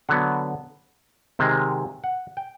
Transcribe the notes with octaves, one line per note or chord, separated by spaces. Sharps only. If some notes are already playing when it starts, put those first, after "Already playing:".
D3 F#3 B3 F#5
C3 D#3 G#3
F#5
G5